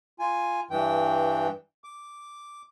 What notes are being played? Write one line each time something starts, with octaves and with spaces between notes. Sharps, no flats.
F4 G#5
G2 E3 G5
D6